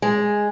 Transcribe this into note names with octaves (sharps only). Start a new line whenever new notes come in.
G#3